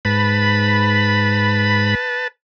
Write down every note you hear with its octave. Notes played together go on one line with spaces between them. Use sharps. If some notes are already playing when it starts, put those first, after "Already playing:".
G#2 B4 A5 B5